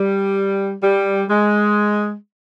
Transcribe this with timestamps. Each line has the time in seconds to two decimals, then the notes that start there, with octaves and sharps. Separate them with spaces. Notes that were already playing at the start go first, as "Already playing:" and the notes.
Already playing: G3
0.82 G3
1.29 G#3